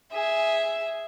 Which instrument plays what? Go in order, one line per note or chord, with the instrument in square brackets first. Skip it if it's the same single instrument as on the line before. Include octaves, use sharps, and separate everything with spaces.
[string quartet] G#4 E5